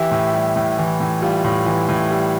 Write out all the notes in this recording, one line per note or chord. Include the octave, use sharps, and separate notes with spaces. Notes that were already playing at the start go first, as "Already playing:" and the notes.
Already playing: E3 E4 G4
A2
G3
A2
E3
A2
G3 F4
A2
E3
A2
G3